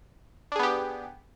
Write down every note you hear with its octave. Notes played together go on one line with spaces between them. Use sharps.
B3 D4 G4 G#4